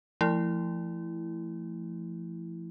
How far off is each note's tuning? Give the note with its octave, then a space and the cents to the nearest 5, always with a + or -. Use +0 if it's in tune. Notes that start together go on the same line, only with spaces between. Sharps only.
F3 -30 A3 +15 E4 +0